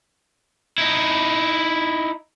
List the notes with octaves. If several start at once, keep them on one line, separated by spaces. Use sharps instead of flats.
D#4 E4